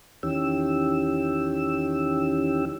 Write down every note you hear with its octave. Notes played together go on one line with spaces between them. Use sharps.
E2 D#3 E3 C#4 G4 E6